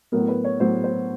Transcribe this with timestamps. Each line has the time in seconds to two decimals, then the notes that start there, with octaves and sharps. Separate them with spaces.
0.12 A2 F#3 B3 A#4
0.28 B4
0.44 C#5
0.60 A2 F#3 B3 C5
0.84 C5